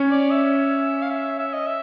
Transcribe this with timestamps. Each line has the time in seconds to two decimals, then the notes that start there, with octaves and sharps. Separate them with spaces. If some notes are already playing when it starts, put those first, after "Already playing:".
Already playing: C#4 C#5
0.11 D5
0.31 E5
1.02 F5
1.10 E5
1.39 E5
1.53 D#5
1.67 E5